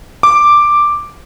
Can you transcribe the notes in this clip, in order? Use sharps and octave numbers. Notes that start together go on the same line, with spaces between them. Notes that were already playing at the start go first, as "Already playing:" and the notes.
D6